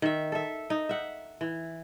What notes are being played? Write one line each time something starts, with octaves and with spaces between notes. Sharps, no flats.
D#3 E5
A4 E5
D#4
E5 F#5
E3